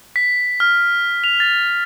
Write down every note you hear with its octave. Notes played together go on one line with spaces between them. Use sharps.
B6
F6
F7
A6